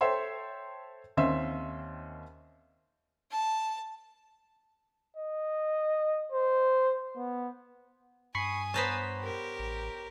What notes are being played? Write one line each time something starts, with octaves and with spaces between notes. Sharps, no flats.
A4 C5 C#5 E5 G5 C6
D#2 D#3 C4 C#4 E5 C6
A5
D#5
C5
B3
G2 G#5 B5 C#6 D#6 C7
B3 C5 C#5 A5 A#5 B6
G4 A#4
A1